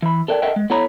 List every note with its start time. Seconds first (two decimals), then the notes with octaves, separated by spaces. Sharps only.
0.02 E3 B5
0.28 A4 A#4 D5 F5 G5
0.42 A4 A#4 D#5 E5 F#5 G5
0.56 G#3
0.70 B3 E4 A4 C#5 A#5 B5